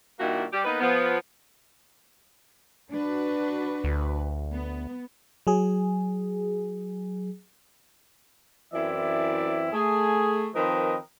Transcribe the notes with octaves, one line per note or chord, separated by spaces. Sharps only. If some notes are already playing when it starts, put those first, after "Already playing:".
G2 A#2 D#3 A#3 E4 F#4
G3 G4
A#3 B3 D#4 B4
F3 B3
D4 F#4 B4
D2
B3
F#3 G#4
F#2 E3 C4 E4 D5 E5
A3 G#4
D#3 F3 C4 A#4 B4 D#5